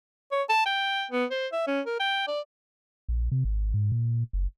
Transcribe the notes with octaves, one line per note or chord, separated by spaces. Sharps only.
C#5
A5
G5
B3
C5
E5
C#4
A#4
G5
D5
A#1
C3
G#1
G#2
A#2
F#1